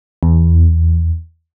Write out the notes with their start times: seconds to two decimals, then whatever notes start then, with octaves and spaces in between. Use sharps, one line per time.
0.23 E2